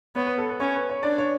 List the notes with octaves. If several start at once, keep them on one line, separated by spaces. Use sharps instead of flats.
B3 C#5
B4
A4
B4
C#4 C#5
B4
C#5
D4 D5
C#5